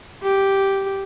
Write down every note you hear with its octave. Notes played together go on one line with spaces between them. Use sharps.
G4